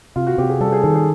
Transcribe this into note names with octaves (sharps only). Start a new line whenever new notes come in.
C3 F4
F#4
C3 G4
G#4
G3 A4
G#4
D#3 A4
G#4